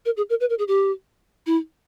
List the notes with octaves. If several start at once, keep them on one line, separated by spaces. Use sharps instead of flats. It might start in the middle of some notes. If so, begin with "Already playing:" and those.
A#4
G#4
A#4
B4
A#4
G#4
G4
E4